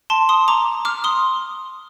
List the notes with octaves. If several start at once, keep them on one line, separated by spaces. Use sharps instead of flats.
A5 C6
C6 D#6
A#5 D6
D6 F6
C6 D#6